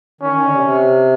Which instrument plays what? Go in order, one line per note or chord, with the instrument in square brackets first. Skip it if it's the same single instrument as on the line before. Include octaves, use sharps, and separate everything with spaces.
[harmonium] D#3 [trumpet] C#4
[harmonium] D#3
D3
C3
C3